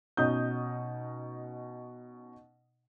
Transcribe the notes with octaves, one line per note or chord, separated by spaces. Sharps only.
B2 C#4 D#4 D#6 G6